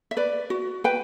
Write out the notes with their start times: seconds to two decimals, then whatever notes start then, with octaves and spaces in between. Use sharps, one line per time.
0.11 E5
0.17 B4 D5
0.50 F#4
0.84 B4 G5